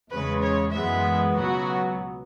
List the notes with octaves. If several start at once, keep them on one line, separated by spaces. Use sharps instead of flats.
E2 C#3 G#3 B4
C#5
F#2 E3 G#3 B3 E5
C#2 B2 F#3 B3 F#4